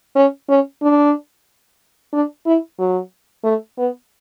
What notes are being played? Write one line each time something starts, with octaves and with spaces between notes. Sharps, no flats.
C#4
C#4
D4
D4
E4
F#3
A3
B3